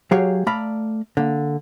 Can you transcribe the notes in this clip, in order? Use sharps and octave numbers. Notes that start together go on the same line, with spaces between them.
F#3 G4 G#4 C#5 D#5 F5
A3 D5 F5 A#5 B5
D3 A#3